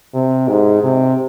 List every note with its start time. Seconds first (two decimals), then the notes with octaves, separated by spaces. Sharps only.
0.14 C3
0.48 G#2
0.83 C3